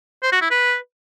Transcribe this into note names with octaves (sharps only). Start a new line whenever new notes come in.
C5
F#4
E4
B4